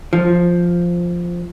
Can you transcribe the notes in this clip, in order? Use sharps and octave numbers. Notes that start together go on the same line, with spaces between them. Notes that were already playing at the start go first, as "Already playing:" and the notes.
F3